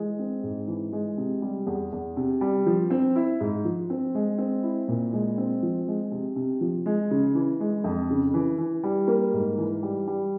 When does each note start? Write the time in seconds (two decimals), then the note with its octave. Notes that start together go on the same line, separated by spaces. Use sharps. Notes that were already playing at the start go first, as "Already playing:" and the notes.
Already playing: E3 G#3
0.19 C4
0.43 G#2
0.68 E3
0.92 G#3
1.17 C3
1.42 G3
1.66 E2
1.92 E2
2.17 C3
2.41 G3
2.66 F3
2.90 C4
3.16 E4
3.41 G#2
3.65 F3
3.90 C4
4.15 G#3
4.38 C4
4.63 E4
4.88 A#2
5.13 G#3
5.38 C4
5.62 F3
5.88 G#3
6.11 C3
6.36 C3
6.61 F3
6.86 G#3
7.11 C#3
7.35 E3
7.60 G#3
7.84 F2
8.10 C#3
8.34 E3
8.58 E3
8.83 G3
9.08 A#3
9.33 G#2
9.58 E3
9.83 G3
10.07 G3